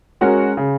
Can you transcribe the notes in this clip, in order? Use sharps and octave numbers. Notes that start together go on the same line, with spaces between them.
G#3 C#4 F#4 A#4
C#3